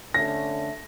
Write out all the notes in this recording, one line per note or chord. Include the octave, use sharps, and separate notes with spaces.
D3 A3 C#4 A#6